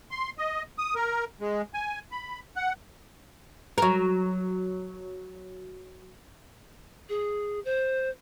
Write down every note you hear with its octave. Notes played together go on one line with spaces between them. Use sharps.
C6
D#5
D#6
A#4
G#3
G#5
B5
F#5
F#3 A#4
G#4
C5